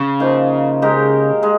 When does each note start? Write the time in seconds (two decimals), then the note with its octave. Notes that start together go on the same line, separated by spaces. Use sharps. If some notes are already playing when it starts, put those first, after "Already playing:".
Already playing: C#3
0.20 F3 A#3 D#4
0.82 G#3 D#4 G4 A#4
1.43 G#3